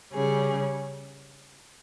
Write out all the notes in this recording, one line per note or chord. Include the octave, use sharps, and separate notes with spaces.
C#3 G3 C#4 G#4